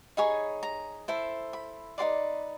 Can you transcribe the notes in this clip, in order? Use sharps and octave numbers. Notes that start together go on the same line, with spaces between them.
D#4 G#4 C#5 B5
A#5
E4 A4 C5
B5
D#4 G4 B4 D5 C6